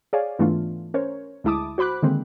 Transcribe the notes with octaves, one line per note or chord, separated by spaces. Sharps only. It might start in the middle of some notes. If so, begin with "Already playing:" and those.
G#4 C#5 D5 F5 G#5
G#2 E3 A3 B3 D4 F4
C#4 A#4 C5 C#5
D2 G#3 E4 A5 D6 D#6
F#4 C5 B5 D6 F#6
D3 D#3 G#3 A#3 C4